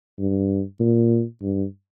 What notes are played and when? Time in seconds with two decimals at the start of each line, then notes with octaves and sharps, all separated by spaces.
0.19 G2
0.80 A#2
1.42 G2